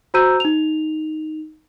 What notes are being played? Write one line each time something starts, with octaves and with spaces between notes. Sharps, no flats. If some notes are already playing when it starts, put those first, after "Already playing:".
F#4 C5 A#5 E6 G6 D#7
D#4 F7